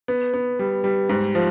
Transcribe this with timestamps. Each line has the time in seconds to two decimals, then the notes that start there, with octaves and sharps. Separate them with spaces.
0.08 B3
0.34 B3
0.59 G3
0.84 G3
1.09 G#2
1.35 F3